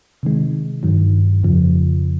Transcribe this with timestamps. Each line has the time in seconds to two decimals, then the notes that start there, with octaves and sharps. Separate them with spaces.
0.23 C3 D#3 G#3
0.83 G2 D#3 F#3
1.43 F2 C#3 F3